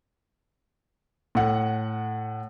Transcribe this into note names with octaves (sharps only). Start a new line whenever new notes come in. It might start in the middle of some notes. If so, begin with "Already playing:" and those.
A2 F#5